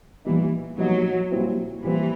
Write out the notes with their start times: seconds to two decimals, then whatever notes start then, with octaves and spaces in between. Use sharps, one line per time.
0.25 A#2 E3 G3 B3 D#4
0.78 A#2 F#3 G3 B3 D#4
1.31 A#2 G3 C4 E4
1.84 A#2 E3 G3 C4 E4